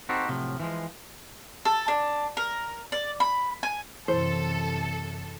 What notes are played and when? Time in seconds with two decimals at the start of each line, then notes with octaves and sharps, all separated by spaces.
0.09 C4 D#4 F#4 G4 A4 C5
0.28 A2 C3 F3 F#3
0.60 E3 F3 G#3
1.65 A4
1.88 D4
2.37 A#4
2.92 D5
3.20 B5
3.63 G#5
4.08 F#2 C3 E3 A4 C5